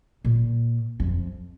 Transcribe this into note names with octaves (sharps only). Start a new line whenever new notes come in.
A#2
F2